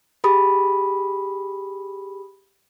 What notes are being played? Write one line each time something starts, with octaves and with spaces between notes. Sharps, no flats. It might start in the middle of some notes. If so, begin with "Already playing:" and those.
G4 G#4 B5 D#6